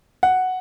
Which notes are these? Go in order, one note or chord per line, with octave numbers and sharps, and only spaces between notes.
F#5